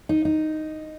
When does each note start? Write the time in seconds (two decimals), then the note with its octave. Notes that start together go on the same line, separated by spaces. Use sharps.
0.09 D#4
0.25 D#4